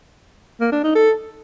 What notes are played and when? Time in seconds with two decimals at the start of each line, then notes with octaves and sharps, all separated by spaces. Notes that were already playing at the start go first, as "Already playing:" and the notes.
0.60 A#3
0.72 D4
0.83 D#4
0.95 A4